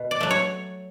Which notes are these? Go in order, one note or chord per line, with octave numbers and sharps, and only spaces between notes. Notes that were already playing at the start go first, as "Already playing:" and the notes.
Already playing: B2
D5
F#3 A3
C#5